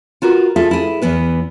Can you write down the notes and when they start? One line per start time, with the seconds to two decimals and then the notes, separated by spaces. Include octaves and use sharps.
0.22 F4 F#4 A#4 B4
0.56 F4 G#4 A4 E5
0.71 E4 G#4
1.02 E2 D#3 E3 B3 B4